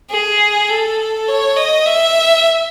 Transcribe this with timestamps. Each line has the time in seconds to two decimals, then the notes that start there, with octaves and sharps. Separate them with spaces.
0.11 G#4
0.69 A4
1.28 C#5
1.56 D#5
1.86 E5